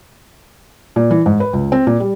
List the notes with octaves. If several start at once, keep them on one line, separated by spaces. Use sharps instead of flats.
A#2
E3
G#2
B4
C#2
C4
A#2
G3